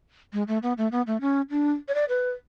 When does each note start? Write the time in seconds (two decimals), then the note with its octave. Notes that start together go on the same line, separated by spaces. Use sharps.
0.33 G#3
0.48 A3
0.63 B3
0.78 A3
0.92 B3
1.07 A3
1.21 C#4
1.50 D4
1.88 C#5
1.95 D5
2.09 B4